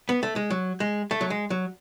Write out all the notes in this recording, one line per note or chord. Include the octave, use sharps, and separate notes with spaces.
B3
A3
G#3
F#3
G#3
A3
F#3
G#3
F#3